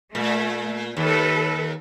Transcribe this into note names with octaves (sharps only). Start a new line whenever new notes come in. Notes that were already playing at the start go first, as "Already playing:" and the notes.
A#2 A3
D#2 A4 B4